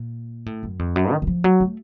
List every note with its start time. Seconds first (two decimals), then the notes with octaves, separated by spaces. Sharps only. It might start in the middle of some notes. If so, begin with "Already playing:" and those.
Already playing: A#2
0.46 A2
0.63 F#2
0.79 F2
0.96 F#2
1.12 D#3
1.22 D#3
1.27 F3
1.44 F#3
1.60 A3